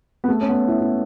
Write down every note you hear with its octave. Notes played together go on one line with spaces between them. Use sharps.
B3
A3
C#4
B3
C#4
E4
E4